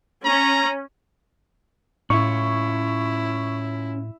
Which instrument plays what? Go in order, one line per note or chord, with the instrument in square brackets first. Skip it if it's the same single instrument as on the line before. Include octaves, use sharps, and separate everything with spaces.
[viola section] C#4 [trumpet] A#5
[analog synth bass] A2 [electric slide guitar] C#4 F4 [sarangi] E4 [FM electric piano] C#6